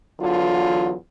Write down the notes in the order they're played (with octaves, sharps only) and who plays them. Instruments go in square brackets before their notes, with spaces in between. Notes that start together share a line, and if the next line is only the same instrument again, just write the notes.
[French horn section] E2 D3 E3 F#3 F4